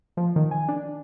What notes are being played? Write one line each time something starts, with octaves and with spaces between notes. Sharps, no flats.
F3
D#3
G#5
D4